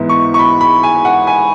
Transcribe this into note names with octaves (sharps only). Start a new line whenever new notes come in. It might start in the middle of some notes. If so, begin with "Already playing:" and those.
Already playing: G#2 E3 B3 E4
C#6
C#6
B5
B5
G#5
F#5
G#5